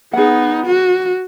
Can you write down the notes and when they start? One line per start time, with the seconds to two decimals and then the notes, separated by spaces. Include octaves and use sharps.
0.13 B3 D#4 G#4 F#5
0.67 F#4